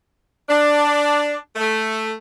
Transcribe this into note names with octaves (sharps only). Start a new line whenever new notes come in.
D4
A3